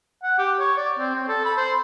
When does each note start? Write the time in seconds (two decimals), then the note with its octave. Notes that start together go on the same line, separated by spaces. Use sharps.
0.23 F#5
0.39 G4
0.60 C#5
0.77 D5
0.99 C4
1.15 C4
1.28 A4
1.45 B5
1.57 C5